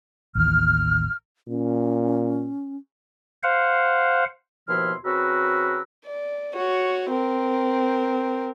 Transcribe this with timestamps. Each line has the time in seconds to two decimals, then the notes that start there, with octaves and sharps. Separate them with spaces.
0.35 A1 D#2 E3 F6
1.48 A#2 C#4
3.43 C5 F5 F#5
4.69 D#2 B2 F3 E4 C6 F6
5.05 C#3 C4 F#4 A#4 B4 E6
6.05 D5
6.54 F#4 C#5
7.10 C4 A#4